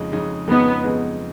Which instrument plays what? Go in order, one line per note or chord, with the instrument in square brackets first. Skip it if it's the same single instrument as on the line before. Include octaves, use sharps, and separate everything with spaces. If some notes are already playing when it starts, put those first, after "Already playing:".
Already playing: [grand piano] F2 C#3 G#3 D#4
F2 C#3 G#3 D#4
[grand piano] F2 C#3 G#3 D#4 [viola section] B3
[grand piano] F2 C#3 G#3 D#4